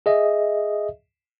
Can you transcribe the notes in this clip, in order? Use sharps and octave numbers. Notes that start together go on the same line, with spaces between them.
G#4 D#5 E5